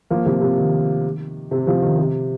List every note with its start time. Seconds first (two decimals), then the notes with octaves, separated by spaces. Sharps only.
0.10 F3 A#3
0.25 C3 F3
0.41 C3
0.58 D#3
1.51 C3
1.67 C3 F3
1.82 D#3
1.98 C3